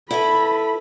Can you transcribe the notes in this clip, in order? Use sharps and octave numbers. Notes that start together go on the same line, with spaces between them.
E4 A4 B4 B5